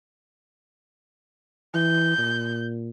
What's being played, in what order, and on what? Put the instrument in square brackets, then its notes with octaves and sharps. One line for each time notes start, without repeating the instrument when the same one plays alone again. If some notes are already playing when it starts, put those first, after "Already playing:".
[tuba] E3 [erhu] G6
[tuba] A#2